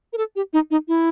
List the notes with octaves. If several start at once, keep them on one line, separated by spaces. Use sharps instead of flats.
A#4
A4
G4
D#4
D#4
E4